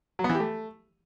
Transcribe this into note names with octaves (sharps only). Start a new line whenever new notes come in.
F#3
B3
E3
G4
A3